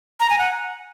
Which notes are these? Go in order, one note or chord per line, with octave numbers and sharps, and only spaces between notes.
A#5
G#5
F#5